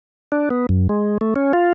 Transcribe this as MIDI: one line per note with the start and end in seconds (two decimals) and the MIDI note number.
0.32 0.49 62
0.50 0.66 59
0.69 0.88 42
0.89 1.18 56
1.21 1.34 57
1.36 1.53 61
1.53 1.73 65